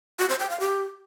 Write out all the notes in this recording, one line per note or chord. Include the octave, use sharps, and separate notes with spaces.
F#4
C5
G5
F5
G4